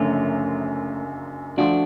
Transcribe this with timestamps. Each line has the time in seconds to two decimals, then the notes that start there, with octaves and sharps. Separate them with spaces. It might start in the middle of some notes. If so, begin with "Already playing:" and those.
Already playing: F#1 F#2 D3 F3 A3 C#4
1.57 F3 A3 D4 F4 F#4